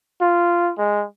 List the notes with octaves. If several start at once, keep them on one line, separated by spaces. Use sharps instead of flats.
F4
G#3